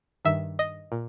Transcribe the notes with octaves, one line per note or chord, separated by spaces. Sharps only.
G2 D#3 E5
D#5
A#2